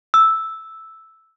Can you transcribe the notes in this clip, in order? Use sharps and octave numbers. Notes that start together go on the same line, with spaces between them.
E6